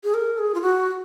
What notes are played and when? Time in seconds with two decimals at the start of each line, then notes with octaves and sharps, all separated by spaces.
0.04 G#4
0.14 A#4
0.38 G#4
0.55 F4
0.62 F#4